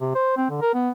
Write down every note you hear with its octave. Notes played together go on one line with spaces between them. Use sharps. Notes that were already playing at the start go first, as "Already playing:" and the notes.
C3
C5
C4
D3
A#4
B3